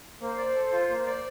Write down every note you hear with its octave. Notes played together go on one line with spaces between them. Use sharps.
A#3 C5
D5
A4
F4
A#3
D5